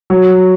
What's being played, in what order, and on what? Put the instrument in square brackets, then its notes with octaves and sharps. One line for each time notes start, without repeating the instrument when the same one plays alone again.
[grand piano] F#3